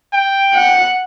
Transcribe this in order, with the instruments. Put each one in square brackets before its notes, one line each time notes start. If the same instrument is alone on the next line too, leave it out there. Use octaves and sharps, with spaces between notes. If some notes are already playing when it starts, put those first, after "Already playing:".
[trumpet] G5
[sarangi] F#5